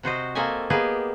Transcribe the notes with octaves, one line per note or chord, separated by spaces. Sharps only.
C3 F#4 C5 D#5
A#3 C4 A4 D#5 E5 G#5
A#3 B3 G4 G#4 D#5